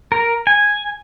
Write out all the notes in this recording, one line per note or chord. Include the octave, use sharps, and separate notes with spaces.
A#4
G#5